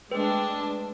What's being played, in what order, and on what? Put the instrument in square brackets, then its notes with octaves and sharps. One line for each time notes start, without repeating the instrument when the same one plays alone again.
[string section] G#3 D4 [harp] A3 G5 [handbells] B4